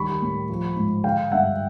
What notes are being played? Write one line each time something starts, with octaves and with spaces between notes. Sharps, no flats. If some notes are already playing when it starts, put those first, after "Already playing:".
Already playing: D#3 G3 B5 C#6
A2
F3
G#2
D3 F5 G5
G2 E5 F#5